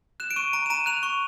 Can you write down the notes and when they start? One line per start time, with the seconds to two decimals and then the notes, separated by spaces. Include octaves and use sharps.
0.20 F#6 E7
0.31 D7
0.36 C#6 D#7
0.53 A#5 D7
0.66 E7
0.70 A#5 D#7
0.86 F#6 F7
1.03 C#6